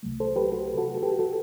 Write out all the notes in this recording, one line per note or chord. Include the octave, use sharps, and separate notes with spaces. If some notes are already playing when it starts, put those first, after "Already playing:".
C2 C3 F#3 A3
A4 C5
G4 B4
F#4 A4
F#4 A4
A4
G4 B4
F#4 A4